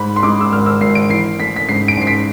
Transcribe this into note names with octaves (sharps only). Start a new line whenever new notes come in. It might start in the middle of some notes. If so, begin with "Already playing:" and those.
Already playing: G#2 B5
C6
G#3 D6
E6
G#1 F6
E6
G#1 C7
D7
E3 C7
A3 B6
B6
G#2 C7
D7
G#2 C7
B6